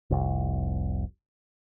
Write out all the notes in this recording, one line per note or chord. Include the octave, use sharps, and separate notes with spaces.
F1 C2